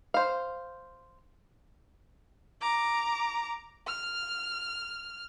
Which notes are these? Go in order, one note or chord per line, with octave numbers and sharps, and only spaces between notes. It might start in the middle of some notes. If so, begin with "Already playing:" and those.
C5 F5
A#5 D6
F6